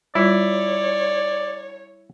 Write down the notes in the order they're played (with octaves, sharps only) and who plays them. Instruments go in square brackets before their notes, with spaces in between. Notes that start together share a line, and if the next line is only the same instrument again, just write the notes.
[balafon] G3 F4 [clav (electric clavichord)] E4 [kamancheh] C#5 [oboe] D5